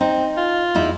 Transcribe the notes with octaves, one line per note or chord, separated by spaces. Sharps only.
C4 D#4
F4
E2 D#4 E4